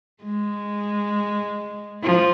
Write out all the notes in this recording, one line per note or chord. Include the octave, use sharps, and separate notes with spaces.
G#3
F3